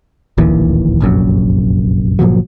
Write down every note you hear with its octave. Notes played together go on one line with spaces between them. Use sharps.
D1 A#1 D#2 E3
F1 A#1 F#2
G1 A#2 F3 F#3